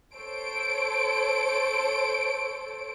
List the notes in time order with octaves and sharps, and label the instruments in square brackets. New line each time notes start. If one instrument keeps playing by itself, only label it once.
[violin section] A4 C5 C#5 D7